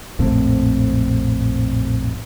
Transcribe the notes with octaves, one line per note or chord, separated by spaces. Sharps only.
A#1 F2 A2 C4